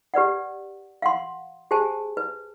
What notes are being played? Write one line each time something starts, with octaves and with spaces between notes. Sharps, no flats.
G4 B4 D5 F#5
F5 F#5 C6
G4 G#4 C5 G#5 A5
B4